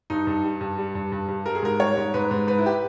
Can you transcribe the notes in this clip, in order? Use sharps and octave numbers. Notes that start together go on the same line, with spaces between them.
G2 D#4
G2
G3
G2
G3
G2
G2
G2
G3 A#4
G#4
G#2 A#4
G3 C#5
G#2
G#2 B4
G#2
G#2 B4
E4
G4